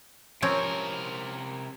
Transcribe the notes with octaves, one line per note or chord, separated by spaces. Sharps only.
C3 F3 C4 C#4 A#4